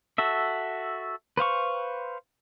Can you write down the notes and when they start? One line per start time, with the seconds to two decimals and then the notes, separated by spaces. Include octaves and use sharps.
0.18 F#4 A4 E5
1.37 B4 C5 F5 C#6